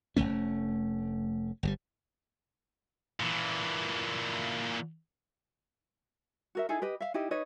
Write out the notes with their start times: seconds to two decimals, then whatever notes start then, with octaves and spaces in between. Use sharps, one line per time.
0.16 F1 A2 A3 C#4
1.63 G1 C#3 G3
3.20 A#2 E3
6.55 F#4 A#4 E5
6.69 D#4 E4 G#4 A4
6.82 G4 B4 D#5
7.00 E5 F5
7.14 D#4 E4 G4 D#5
7.31 D#4 B4 C#5 D#5